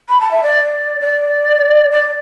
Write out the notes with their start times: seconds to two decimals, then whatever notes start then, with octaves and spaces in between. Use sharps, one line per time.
0.09 B5
0.20 A5
0.31 E5
0.43 D5
1.01 D5
1.91 D5